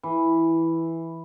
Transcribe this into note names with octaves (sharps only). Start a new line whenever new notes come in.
E3